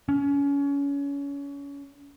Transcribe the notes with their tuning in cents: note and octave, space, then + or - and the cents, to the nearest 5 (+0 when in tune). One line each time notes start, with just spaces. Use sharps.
C#4 +30